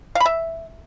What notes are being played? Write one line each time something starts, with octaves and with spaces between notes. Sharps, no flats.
F5
B5
E5